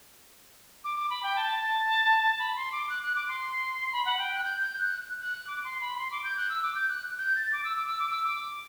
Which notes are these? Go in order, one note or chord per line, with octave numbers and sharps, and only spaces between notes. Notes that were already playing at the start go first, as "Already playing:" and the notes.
D6
D6
B5
G5
A5
B5
C6
D6
F#6
F#6
D6
C6
B5
F#5
G5
F#6
G6
G6
F#6
F#6
D6
C6
B5
C6
D6
G6
F#6
E6
D6
G6
F#6
G6
A6
D6
E6
D6
E6
D6
E6
D6